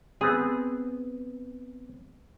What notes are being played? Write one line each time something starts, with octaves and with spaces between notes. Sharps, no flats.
B3 C4 G#4